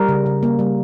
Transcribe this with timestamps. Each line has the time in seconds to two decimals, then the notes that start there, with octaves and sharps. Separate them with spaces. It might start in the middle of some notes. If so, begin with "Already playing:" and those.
Already playing: G3 A#4
0.09 C#3
0.26 C#3
0.43 A#3
0.59 G3